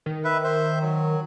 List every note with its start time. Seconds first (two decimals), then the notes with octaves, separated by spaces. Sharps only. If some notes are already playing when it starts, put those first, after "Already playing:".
0.06 D#3
0.25 B4 E5
0.44 C5 E5
0.81 F#3